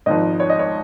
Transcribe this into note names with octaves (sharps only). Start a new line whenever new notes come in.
G#1 G#2 F3 D#5
C#5
D#5
C#5